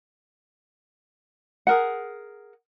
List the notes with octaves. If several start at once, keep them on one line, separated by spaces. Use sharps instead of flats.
G#4 A#4 F#5